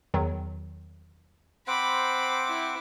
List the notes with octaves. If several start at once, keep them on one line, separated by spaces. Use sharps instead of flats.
E2 D#3 F#3
C4 C5 F#5 B5 D6
E4